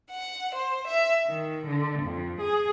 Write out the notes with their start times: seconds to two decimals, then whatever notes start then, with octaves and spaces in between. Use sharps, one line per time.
0.11 F#5
0.55 C5
0.87 E5
1.27 D#3
1.66 D3
2.03 F2
2.40 G#4